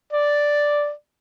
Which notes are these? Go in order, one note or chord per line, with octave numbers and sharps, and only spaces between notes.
D5